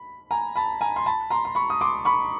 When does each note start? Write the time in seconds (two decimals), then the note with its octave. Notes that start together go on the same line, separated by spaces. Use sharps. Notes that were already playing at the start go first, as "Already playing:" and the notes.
Already playing: B5
0.31 G#5 A#5
0.56 A5 B5
0.81 G#5 A#5
0.96 C6
1.06 A5 B5
1.30 A#5 C6
1.45 C6
1.55 B5 C#6
1.70 D#6
1.81 C6 D6
2.05 B5 C#6